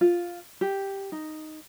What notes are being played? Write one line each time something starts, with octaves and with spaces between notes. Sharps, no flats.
F4
G4
D#4